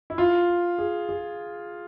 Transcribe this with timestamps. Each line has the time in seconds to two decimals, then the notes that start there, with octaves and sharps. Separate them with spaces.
0.10 E4
0.18 F4
0.78 G#4
1.09 G#4